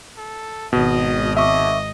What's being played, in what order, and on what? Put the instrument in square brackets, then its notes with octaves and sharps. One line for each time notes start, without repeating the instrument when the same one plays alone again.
[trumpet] A4
[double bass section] G#1 [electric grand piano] B2 [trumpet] D#5
[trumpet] D#5 [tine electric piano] E5 C#6 D6